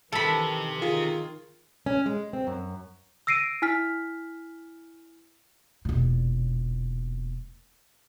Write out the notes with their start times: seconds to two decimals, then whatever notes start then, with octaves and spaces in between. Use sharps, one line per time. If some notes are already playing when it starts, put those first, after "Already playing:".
0.12 C3 D#3 E3 A4 B5
0.82 D#3 F4 G#4
1.86 C#4
2.06 G#3
2.33 C4
2.47 F#2
3.27 E6 A#6 C7 D7 D#7
3.62 E4 G#5 F6 B6
5.85 E1 A#2